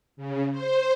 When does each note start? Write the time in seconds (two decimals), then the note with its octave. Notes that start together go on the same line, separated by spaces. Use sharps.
0.17 C#3
0.51 C5